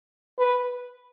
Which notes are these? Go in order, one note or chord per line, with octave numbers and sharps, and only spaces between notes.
B4